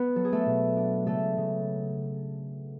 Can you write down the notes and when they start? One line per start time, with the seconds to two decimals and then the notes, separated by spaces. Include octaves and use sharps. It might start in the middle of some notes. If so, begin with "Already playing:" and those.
Already playing: B3 B4
0.15 F#3 A4
0.25 G#4
0.32 A3 A4
0.46 B2
0.77 D4
1.06 C#3 A3 A4
1.37 C#3